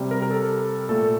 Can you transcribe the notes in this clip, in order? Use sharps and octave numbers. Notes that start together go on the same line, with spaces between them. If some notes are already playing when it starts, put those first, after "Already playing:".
Already playing: C3 G3
A#4
A#4
A4
A#2 A3 A4